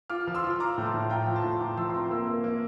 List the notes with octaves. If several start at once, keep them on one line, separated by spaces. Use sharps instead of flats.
F4 D6 F6
F3
C6 E6
F4
F4 A#5 D6
A2
A5 C6
A2
F4 G5 A#5
F3
A5 C6
A2
C6
F4 A#5 D6
F3 C6 E6
C6
C4 A#5 D6
A#3 C6 E6
A#3
A#3